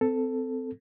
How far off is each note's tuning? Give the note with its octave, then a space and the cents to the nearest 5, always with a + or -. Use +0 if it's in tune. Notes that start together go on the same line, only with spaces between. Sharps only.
C4 -25 A4 +5